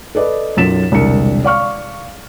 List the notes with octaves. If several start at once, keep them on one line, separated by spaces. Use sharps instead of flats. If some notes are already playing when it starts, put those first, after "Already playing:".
A4 B4 D5 D#5
B1 F#2 F4 A6 B6 E7
E1 C2 D3 A#4 C#7
D5 F5 C#6 F6